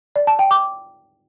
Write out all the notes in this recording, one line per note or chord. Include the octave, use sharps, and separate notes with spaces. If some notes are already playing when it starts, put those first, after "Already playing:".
D5
A5
G5
D6